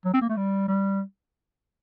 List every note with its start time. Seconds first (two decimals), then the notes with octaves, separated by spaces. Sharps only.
0.05 F#3
0.14 C4
0.22 A#3
0.29 A3
0.37 G3
0.68 G3